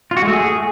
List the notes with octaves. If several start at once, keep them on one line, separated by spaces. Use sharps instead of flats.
F4
F#4
G#3
A3
G#4